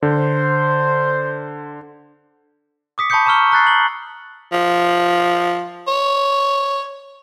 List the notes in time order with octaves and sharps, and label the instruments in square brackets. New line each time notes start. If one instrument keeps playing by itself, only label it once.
[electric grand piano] D3 [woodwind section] C5
[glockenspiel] D6 D#6 B6 C#7
A5 B5 C#6 D#6 G6 C#7
A5 A#5 C#6 E6 F6 G7
A#5 F#6 A6 C7
F#7 G7
[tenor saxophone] F3
C#5